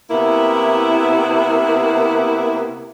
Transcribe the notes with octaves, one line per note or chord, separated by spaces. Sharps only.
C3 A#3 B3 E4